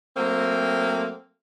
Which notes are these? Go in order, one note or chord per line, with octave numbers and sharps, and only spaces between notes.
F#3 A3 A#3 C4